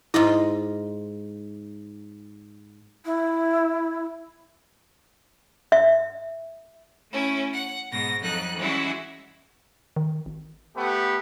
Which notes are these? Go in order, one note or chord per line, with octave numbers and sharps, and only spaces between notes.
G#2 E4 F4 D#5
E4
E5
A3 C#4 E4
F#5
G#2 B2 A#6
F2 F#3 D#4 A4 F#6
E3 G3 G#3 C#4 E4 F#4
D#3
G#1
A3 B3 G4